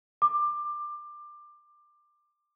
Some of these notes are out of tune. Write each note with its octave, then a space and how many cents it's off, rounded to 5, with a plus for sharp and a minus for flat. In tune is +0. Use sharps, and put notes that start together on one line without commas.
D6 +20